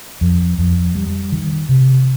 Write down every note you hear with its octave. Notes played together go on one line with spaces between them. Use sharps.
F2
F2
G3
D#3
C3